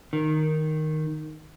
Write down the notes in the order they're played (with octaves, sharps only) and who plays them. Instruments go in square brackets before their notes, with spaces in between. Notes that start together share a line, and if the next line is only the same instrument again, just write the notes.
[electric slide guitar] D#3